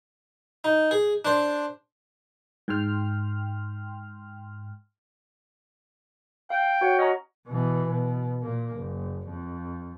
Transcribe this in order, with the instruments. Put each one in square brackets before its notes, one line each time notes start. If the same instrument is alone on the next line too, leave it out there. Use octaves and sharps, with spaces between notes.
[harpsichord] D#4
G#4
D4 C5
[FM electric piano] G#2 G5 C6 F6
[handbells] F5 [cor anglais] G5
[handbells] F#4 C#5 F#5
[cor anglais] C#4 [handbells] D#5 A#5
[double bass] B2 E3
B2
A#2 A#3
F#1
F2